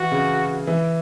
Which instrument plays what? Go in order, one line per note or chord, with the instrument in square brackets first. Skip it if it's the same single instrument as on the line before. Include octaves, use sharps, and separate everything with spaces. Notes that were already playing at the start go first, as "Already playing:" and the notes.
Already playing: [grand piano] E3 [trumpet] F#4
[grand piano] C#3
E3